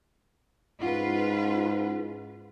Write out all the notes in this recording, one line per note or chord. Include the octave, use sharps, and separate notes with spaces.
G#2 C#4 E4 F4 B4 F#5